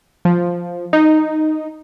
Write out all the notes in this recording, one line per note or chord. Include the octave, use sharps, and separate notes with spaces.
F3
D#4